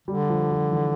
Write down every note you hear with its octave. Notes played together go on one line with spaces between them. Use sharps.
D3 G3
F3
F3
E3